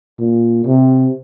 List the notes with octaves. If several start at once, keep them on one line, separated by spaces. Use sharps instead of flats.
A#2
C3